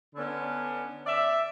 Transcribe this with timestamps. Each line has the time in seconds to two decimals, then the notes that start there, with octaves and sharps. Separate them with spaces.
0.15 D3 B3 C#4
1.06 D5 E5